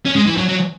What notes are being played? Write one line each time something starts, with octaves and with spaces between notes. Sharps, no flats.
C#4
G#3
E3
F#3
F#3